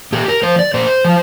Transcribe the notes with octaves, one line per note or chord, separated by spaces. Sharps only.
A#2 G4
A#4
F3 C5
D5
A#2 C5
F3